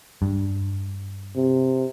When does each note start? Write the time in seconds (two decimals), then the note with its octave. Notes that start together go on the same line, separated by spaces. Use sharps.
0.22 G2
1.36 C3